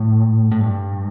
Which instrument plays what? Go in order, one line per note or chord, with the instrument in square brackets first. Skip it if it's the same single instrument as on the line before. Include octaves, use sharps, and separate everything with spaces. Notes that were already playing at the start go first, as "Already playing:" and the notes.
Already playing: [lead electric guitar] A2
A2
G2